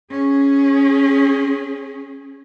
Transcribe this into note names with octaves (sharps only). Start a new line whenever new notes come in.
C#4 G#4